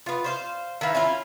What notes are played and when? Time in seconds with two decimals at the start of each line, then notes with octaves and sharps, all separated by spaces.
0.06 B3 F4
0.24 C5 C#5 F5
0.81 D#3 E3 E5 F5
0.95 C#4 E4 F4 E5